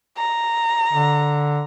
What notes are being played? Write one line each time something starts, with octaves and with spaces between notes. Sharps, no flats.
A#5
D3